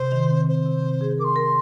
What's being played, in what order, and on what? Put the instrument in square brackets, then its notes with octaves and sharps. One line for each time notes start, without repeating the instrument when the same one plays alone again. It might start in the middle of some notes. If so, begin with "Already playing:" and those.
Already playing: [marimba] C3 [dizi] C5
[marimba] D#3
C4
[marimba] C4 [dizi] C5
[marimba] C3
C4
G#4
[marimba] A#4 [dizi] D6
[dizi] C6
[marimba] A#4